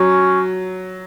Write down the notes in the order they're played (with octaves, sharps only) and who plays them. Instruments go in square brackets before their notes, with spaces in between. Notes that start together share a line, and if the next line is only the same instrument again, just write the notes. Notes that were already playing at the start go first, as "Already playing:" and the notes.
Already playing: [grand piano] F#3 [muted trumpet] C#4